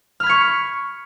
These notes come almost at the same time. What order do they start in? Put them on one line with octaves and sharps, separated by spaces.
F6 B5 G#6 C#6